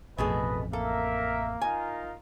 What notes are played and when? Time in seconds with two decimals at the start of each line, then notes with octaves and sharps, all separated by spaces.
0.18 A1 F2 B2 A3 G#4 B4 D#5
0.73 A#3 A4 A#4 E5
1.62 D#4 F4 A#4 G#5